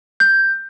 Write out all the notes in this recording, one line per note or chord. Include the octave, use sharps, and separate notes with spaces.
G6